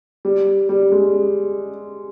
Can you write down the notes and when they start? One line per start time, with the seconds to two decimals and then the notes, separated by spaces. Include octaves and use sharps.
0.25 G3
0.69 G3
0.92 G#3